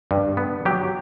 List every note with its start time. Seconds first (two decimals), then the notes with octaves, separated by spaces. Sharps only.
0.11 G2
0.37 B3
0.65 F#3 G4